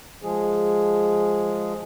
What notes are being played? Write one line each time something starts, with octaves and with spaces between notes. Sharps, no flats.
F3 G#3 G#4